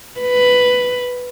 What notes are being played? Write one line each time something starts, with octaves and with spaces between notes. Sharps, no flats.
B4